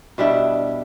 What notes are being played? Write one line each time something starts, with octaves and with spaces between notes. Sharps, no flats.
B2 G3 D4 E4